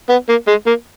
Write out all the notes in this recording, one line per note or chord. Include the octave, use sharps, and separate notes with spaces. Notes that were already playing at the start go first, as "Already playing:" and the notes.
B3
A#3
G#3
A#3